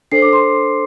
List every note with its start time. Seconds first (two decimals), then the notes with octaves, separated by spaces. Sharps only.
0.12 D4 A4 C5 C7
0.22 D6
0.33 C6